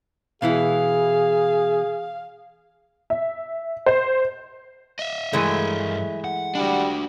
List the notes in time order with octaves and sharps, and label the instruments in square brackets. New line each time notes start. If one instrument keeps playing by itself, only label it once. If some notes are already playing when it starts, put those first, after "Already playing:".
[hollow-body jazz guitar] B2 E3 E4 [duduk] G#4 [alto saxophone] F5
[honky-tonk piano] E5
C5
[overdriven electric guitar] D#5 E5
[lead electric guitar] G2 A#4 [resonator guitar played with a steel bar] E3 G#3 A3
[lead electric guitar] F#5
[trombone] G3 [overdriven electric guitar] D4 F#4